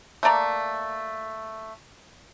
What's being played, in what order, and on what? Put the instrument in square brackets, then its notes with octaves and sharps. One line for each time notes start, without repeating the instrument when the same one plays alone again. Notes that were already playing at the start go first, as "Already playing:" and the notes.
[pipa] A3 A#3 D5 A#5